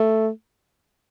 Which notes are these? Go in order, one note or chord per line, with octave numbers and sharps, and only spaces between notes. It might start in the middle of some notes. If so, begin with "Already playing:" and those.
Already playing: A3